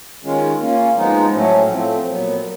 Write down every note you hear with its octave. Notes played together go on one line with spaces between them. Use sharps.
D#3 G#3 C#4 F4
A#3 C#4 F4
F3 G#3 B3 D#4
A2 F#3 A3 C#4
F3 A3 C4
A#2 F#3 B3